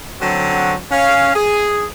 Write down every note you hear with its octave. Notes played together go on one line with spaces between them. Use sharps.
D3 F#3 C4 F#4
C#4 F5
G#4